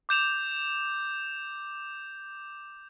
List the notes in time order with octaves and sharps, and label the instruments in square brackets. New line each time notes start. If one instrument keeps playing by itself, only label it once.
[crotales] D6 G6 E7 F7